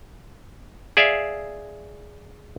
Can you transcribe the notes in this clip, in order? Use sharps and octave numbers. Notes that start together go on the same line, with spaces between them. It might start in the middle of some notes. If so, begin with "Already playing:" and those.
G#4 D5 E5 F5